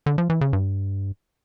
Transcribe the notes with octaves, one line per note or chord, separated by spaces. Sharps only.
D3
F3
E3
C#3
G2